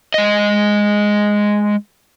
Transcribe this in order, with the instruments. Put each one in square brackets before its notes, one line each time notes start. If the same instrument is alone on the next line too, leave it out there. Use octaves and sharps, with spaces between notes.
[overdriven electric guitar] G#3 D#5